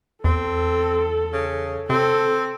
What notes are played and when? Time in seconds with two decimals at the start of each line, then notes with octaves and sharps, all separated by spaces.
0.24 E2 C4 A4
1.33 C#3
1.90 C3 C4 A4